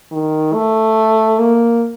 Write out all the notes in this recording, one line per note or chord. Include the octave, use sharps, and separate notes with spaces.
D#3
A3
A#3